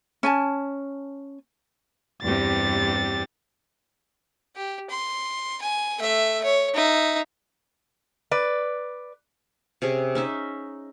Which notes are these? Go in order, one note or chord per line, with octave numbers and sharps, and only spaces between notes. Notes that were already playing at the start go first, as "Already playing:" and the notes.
C#4 G#5 A5
E2 G2 C3 G4 A6
G4
C6
G#5
A3 E5
C#5
D#4 E5
B4 D5
C3 C#4 G#4
C#4 D#4 E5